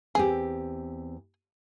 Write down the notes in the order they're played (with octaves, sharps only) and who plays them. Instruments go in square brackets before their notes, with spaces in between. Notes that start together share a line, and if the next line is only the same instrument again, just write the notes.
[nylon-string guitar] E2 C4 G4 [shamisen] G#4